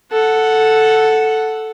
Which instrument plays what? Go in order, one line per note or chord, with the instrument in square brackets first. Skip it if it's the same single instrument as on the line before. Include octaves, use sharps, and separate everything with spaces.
[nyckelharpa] A4 F#5